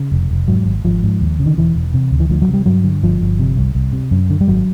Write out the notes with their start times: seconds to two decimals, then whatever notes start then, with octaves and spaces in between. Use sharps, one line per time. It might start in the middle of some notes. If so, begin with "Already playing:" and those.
Already playing: C#3
0.12 F1
0.31 F1
0.48 G#2 F#3
0.66 G#1
0.85 G#1 F3
1.03 G#2
1.21 D#2
1.40 C#3
1.46 D#3
1.57 E1 E3
1.75 E1
1.94 C3
2.11 D2
2.20 E3
2.30 D2 F3
2.42 F#3
2.48 C3
2.54 G3
2.66 G2 F#3
2.84 D3
3.03 G1 F3
3.21 G1
3.39 C3
3.57 C2
3.75 C2
3.93 C3
4.11 F#2
4.30 D3
4.41 G3
4.47 G#1 F#3